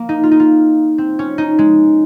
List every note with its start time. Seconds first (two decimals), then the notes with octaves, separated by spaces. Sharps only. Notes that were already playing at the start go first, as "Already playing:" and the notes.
Already playing: A#3
0.09 D#4
0.23 F4
0.31 D#4
0.40 F4
0.98 C4
1.19 C#4
1.38 D#4
1.59 G#3